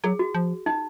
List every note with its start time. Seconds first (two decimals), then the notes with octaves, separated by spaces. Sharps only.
0.04 F#3 G#4
0.19 F#4
0.35 F3
0.66 D#4